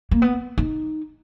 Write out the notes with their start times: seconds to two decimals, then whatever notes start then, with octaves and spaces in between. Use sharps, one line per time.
0.11 A#3
0.22 B3
0.58 D#4